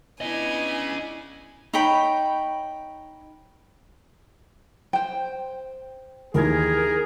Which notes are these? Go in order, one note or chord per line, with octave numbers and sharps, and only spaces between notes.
B3 C#4 D4 E4 D#5 G#5
D#4 C#5 G5 B5
C5 G5
D#2 E3 G#4 A#4 G#6